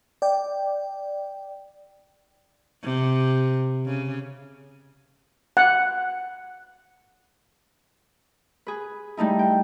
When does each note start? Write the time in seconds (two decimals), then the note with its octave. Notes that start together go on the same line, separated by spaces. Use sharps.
0.22 D5 G5
2.83 C3
3.86 C#3
5.57 F#5
8.67 G#4 B4
9.17 G3 A3 D#4 E4
9.39 G5